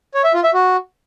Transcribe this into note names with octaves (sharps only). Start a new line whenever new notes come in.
C#5
E5
F4
E5
F#4